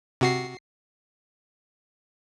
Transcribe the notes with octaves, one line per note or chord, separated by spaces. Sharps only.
C3 F#4 C7